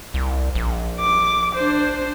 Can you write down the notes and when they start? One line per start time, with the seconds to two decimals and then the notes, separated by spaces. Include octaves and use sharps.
0.14 C2
0.55 A#1
1.00 D6
1.55 D4 C5